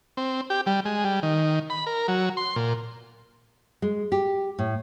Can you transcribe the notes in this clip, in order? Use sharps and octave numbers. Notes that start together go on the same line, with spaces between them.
C4
G4
G3
G#3
G3
D#3
B5
A#4
F#3
C6
A#2
G#3
G4
A2